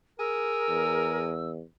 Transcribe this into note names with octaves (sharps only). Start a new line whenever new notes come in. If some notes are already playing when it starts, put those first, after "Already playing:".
G#4 A#4 E6
E2